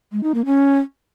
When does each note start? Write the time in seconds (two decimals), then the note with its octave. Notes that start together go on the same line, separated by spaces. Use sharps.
0.12 G#3
0.23 D#4
0.34 A#3
0.46 C#4